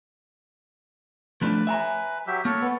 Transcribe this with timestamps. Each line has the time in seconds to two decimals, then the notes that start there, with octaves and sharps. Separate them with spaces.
1.41 F3 A3 D4 B4
1.67 E5 G#5 A#5
2.27 F#3 G4 E5
2.45 A#3 A4 C#5
2.62 B3